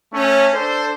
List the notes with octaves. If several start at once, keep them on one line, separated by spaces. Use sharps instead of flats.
A3 C#4
D4 A4 C5